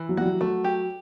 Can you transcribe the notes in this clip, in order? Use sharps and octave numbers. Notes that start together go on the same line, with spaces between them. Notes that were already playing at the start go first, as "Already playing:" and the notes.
Already playing: E3
F#3
G3 F#4
F#3
F#3 A3
G4